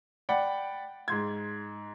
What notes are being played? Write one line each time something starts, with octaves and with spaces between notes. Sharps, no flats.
D5 F#5 G5 B5
G#2 C6 G#6